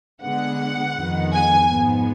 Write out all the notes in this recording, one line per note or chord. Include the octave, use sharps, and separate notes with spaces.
D3 G#3 B3 F#5
F2 D#3 G#3 B3
G#5
G#2 F3 B3